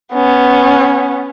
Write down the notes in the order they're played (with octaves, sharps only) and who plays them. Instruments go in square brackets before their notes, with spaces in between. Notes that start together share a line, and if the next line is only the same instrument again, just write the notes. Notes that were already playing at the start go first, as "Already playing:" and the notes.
[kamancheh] B3 C#4